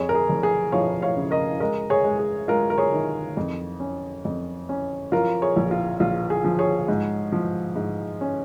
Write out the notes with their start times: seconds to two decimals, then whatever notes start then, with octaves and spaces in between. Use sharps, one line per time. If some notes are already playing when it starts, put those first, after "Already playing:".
Already playing: F2 G#4 C#5
0.09 A#4
0.15 G#4
0.29 F1
0.43 G#4
0.72 F3 C#5 F5
1.02 C#5 F5
1.16 C#3
1.31 A#4 D#5
1.60 G#3 A#4 D#5
1.90 G#4 C#5
2.04 G#3
2.19 G#4
2.48 G#3 F4 A#4
2.70 A#4
2.78 G#4 C#5
2.93 D#3
3.37 F2
3.80 C#4
4.25 F2
4.69 C#4
5.12 F3 F4 A#4
5.42 G#4 C#5
5.56 A#1
5.71 F4
6.00 A#1 F4
6.30 G#4
6.44 F3
6.59 G#4 C#5
6.88 G#2
7.32 F3
7.76 G#2
8.21 C#4